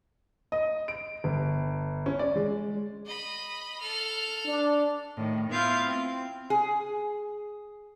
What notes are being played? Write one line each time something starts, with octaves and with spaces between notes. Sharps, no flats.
D#5
D7
G1
C#4
D5
G#3
D#5 B5
A4 F6
D4
A2 D#3
B3 E4 F4 F5 G6 G#6
C4
G#4